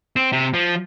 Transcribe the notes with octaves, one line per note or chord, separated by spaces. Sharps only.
C4
C3
F3